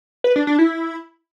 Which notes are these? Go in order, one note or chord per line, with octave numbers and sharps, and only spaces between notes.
B4
D4
D4
E4